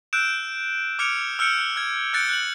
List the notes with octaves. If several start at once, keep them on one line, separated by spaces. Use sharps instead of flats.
E6 F#6 G6 D7 E7
D6 F6 G#6 C#7 D7 F7
E6 F6 G6 C#7 D7
F6 G#6
E6 F#6 G6 A6 C#7 D7
F#6 F#7